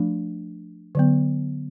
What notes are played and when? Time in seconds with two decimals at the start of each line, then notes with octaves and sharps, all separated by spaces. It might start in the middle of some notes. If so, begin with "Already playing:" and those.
Already playing: F3 A3 D4
0.95 D3 F#3 B3